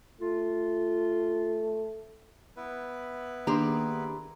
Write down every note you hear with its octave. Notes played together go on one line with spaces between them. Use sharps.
A3 F4
B3 E4 B4
D#3 A#3 D4 G4 G#4 A#5 C6